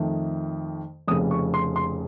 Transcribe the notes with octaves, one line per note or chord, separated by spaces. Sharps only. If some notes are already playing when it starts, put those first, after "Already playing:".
Already playing: F2 D#3 A3
F1 F2 C#3 D#6
C#6
C6
C6